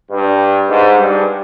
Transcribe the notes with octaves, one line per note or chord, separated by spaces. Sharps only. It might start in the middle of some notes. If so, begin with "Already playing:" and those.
G2
G#2
G2